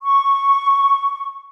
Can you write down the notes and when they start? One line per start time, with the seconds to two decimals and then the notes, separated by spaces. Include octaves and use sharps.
0.02 C#6